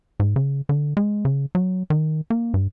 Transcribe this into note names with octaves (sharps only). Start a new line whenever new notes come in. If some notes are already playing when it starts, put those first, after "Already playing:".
G#2
C#3
D3
G#3
C#3
F#3
D#3
A#3
G2